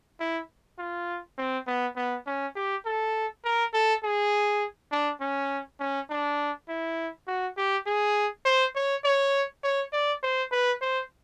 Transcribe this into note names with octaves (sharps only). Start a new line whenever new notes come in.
E4
F4
C4
B3
B3
C#4
G4
A4
A#4
A4
G#4
D4
C#4
C#4
D4
E4
F#4
G4
G#4
C5
C#5
C#5
C#5
D5
C5
B4
C5